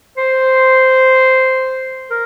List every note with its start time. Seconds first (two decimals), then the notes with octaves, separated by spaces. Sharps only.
0.18 C5
2.10 A#4